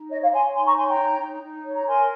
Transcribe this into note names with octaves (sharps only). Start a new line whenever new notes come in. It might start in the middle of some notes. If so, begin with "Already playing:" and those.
Already playing: D#4
C#5 D#5
C#5 F5
C#5 G#5 C6
D#4 G#5 C6
A#5 C#6
C#5 G#5 C6
G5 A#5
D#4
D#4
D#4
C#5
A#5
A#4 G#5 C6